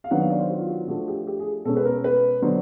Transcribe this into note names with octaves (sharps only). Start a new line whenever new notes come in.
F5
D#3 F#3 B3 D4 F#5
F5
D5
C5
F#4
F4
F#4
F4
F3 A3 D4 F#4
G4
G4
G#4
B2 G#3 C#4 A4
B4
A#4
B4
D3 F#3 B3 D4 C5